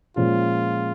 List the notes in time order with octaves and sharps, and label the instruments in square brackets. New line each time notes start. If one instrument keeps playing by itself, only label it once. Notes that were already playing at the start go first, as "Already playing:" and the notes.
[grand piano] A#2 F3 G#3 C#4 [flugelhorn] F4